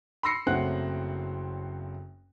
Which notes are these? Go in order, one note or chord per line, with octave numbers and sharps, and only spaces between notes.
B5 C6 E6 A#6 C7 C#7
F#1 F#3 A3 C4 F#5 F#6